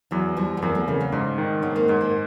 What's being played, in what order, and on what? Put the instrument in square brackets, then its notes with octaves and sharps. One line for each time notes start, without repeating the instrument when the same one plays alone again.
[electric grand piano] E2 [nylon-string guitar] E3 F#3
[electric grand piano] E2 [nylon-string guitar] F3 G3
[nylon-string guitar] B3
[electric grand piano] E2 [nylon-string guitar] A#3 C4
[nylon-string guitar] A3 B3
[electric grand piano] C#3 [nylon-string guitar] A#3 C4
[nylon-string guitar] B3 C#4
[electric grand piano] G#2 [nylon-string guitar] C4 D4
[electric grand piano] D#3
[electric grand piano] G#2 [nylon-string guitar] B3 C#4
[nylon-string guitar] A#3 C4
[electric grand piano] G#2 [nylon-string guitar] B3 C#4
[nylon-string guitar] A#3 C4